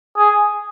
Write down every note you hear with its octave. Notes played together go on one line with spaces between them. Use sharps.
G#4